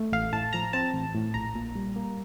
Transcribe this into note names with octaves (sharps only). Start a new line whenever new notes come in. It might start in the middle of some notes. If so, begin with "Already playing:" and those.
Already playing: A3
A1 F5
A2 A5
F3 A#5
C4 A5
A1
A2
A#1 A#5
A#2
G3
A#3